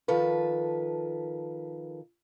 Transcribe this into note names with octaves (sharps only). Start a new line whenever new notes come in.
D#3 F3 A4 B4